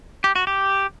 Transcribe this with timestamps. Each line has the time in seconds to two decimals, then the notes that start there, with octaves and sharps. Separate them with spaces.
0.24 G4
0.36 F#4
0.47 G4